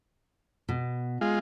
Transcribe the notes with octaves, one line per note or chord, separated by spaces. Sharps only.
B2
G#3 F4